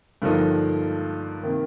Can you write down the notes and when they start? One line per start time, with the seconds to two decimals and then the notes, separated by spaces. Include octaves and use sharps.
0.22 G2 D3 F3 A#3 D#4
1.43 C3 D#3 A#3